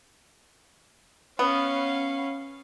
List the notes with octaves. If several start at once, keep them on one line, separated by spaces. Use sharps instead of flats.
B3 C#4 F5